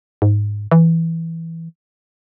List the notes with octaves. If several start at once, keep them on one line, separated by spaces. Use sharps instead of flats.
G#2
E3